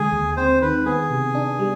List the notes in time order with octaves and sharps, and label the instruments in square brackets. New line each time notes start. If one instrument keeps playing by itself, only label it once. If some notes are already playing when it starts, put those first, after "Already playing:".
Already playing: [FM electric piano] D3 G#3 [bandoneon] G#4
[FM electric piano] D#2
[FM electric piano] C4 [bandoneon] C5
[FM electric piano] D#3 [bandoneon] B4
[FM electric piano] B3 [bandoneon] G#4
[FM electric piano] C3
D4
G3